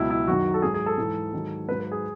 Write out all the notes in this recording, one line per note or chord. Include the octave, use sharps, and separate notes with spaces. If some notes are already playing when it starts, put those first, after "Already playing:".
Already playing: C#2 B2 F#3 E4
E4
F#2 D#3 F#3 F#4
A4
G#2 F#3 G#4
G#4
A4
G#2 E3
G#2 D#3 F#3
G#2 F#3 B4
B4
G#4